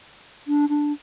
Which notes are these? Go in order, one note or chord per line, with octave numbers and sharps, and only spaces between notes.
D4
D4